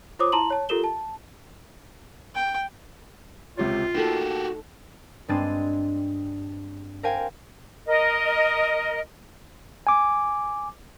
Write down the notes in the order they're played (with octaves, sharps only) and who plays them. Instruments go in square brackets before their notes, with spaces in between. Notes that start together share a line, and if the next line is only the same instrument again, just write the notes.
[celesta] F4 C5 C#5 D6 D#6
E4 A5 A#5 C6 F#7
C#5 A5
F4 G4 A4 A#4 E7 G7
A5
[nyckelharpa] G5
[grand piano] C#2 C3 C#5 [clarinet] F4
[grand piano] A#3 [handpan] D#4 A4 [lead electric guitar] F#4 G4
[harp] G2 G#3 C4 D4 A6 D#7
A#4 C5 F5 G5 G#5
[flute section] A#4 D#5
[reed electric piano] G#5 D6